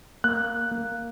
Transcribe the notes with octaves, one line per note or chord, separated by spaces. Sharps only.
A#3 F#6
A#3